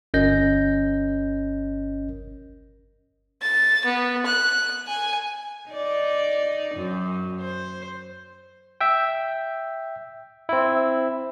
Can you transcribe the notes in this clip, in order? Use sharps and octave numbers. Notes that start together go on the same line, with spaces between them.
G1 C#4 A#4 D#5 G6 A#6
A6
B3
F#6
G#5
D#4 D5
F#2
C5
E5 G5
C4 E4